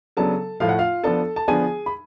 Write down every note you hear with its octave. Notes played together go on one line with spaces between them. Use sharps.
C#3 F#3 B3 D4 A4 A5
A2 F3 A3 F5
F#5
F4 F5
F3 B3 D4 A4 A5
A5
D3 F3 B3 D4 G#4 G#5
B5